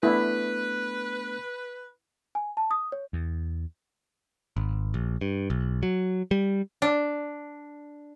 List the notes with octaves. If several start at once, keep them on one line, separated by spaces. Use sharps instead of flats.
A3 B3 D4 E4 B4
G#5
A5
D#6
C#5
E2
G#1
A#1
G2
B1
F#3
G3
D4